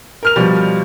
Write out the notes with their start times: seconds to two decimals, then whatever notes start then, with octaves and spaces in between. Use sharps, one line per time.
0.23 A#4 F6 F7
0.36 B2 F3 G3